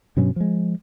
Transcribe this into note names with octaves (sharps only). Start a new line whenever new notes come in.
G2 B2 F#3 C#4
F3 G#3